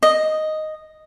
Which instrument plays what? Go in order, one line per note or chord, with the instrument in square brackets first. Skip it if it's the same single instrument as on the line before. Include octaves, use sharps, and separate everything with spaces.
[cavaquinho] D#5